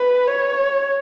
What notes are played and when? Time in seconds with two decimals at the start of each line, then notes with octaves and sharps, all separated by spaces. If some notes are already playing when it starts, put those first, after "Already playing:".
Already playing: B4
0.28 C#5